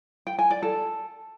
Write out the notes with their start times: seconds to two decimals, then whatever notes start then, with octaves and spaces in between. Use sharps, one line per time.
0.27 G5
0.39 G#5
0.51 D5
0.63 A4